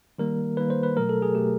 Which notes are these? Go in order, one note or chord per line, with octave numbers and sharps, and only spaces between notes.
D#3 G3 A#3 A#4
D#3 G3 A#3 B4
C5
B4
B2 F#3 A3 A#4
A4
G#4
B2 F#3 A3 G4